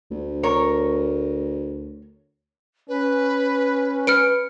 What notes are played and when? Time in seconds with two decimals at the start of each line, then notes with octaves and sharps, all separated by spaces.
0.11 D2
0.43 A#4 C#5
2.89 C#4 B4
4.07 B4 F6 C#7 D7